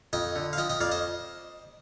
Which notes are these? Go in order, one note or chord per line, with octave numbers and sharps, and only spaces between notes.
F2 D#5 G5
D3
F5
F3 D#5 G5
D#5 G5
F2 D5 F5
C5 D#5